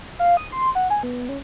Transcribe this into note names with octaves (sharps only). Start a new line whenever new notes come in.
F5
D#6
C6
F#5
G#5
B3
C#4